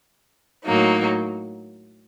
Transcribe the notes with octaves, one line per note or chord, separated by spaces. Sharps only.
A2 F#3 A#3 D#4